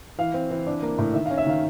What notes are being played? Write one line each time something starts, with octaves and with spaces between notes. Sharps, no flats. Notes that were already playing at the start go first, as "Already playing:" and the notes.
E3 F5
C4
E3
D4
A#3
A2
D#3 E5
C#4 F5
E5
D#3 F5